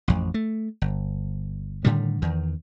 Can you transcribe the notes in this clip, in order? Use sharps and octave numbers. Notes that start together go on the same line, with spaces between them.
A1 F2
A3
G1
A2 D3 D#3 G3
E2 D#3